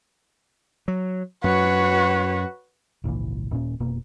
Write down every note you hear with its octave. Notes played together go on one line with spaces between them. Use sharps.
F#3
F#2 F#4 B4 C#5
G#1 C#2 A#2 E3
D#1 A#2 C#4
F1 B2 A#3